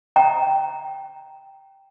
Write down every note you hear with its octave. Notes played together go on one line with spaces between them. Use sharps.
G5 A#5